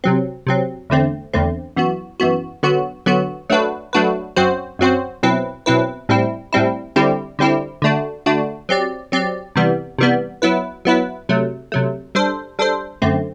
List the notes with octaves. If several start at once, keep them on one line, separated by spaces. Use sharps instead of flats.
C3 F#3 C4
C3 F#3 C4
E2 D3 A3 C4
E2 D3 A3 C4
F#2 E3 B3 F#4
F#2 E3 B3 F#4
D3 F#3 B3 F#4
D3 F#3 B3 F#4
F#3 A3 D4 F#4 B4
F#3 A3 D4 F#4 B4
F#2 F#3 C4 F#4 C5
F#2 F#3 C4 F#4 C5
B2 F#3 C4 E4 B4
B2 F#3 C4 E4 B4
A2 G3 C4 E4
A2 G3 C4 E4
D3 G3 C4 E4 G4
D3 G3 C4 E4 G4
D3 A3 D4 F#4
D3 A3 D4 F#4
F#3 C4 G4 D5
F#3 C4 G4 D5
C3 E3 G3 B3
C3 E3 G3 B3
F#3 B3 E4 B4
F#3 B3 E4 B4
C3 F#3 A3
C3 F#3 A3
G3 D4 A4 C5
G3 D4 A4 C5
F#2 D3 A3 C4